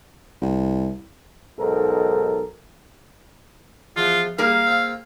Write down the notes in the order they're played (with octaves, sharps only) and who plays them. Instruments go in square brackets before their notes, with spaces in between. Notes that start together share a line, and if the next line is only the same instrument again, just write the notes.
[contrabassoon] C2
[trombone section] B1 G#2 A4 A#4
[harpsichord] E2 F3 F#4 [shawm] F4
[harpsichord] G3 [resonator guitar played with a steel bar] A#3 G#4 A#4 [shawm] F5
[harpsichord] C4 F4